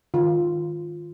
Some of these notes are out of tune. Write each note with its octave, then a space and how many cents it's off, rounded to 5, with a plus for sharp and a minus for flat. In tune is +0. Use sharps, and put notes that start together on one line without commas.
D#3 +0 F4 +0